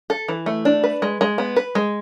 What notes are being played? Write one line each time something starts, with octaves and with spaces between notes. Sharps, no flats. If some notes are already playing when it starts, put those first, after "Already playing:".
A4
E3
A3
D4
B4
G#3
G#3
B3
B4
G#3